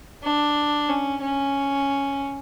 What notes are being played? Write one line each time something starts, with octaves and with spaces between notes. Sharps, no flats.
D4
C#4
C#4